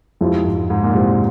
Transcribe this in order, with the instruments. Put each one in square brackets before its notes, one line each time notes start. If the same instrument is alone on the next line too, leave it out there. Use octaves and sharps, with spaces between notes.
[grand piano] F2 [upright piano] F3 G#3 C4 E4 G4
[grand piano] G#2
G#2
A#2
[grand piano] C3 [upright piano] F3 G#3 C4 E4 G4